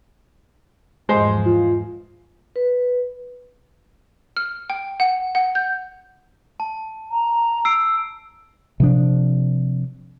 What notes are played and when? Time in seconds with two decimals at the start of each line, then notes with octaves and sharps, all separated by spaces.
1.09 E2 G#2 F3 G#3 C5
1.46 F4
2.56 B4
4.37 F6
4.70 G5
5.00 F#5
5.35 F#5
5.55 G6
6.60 A5
7.11 A#5
7.65 E6 C7 D7
8.80 C3 F3 D4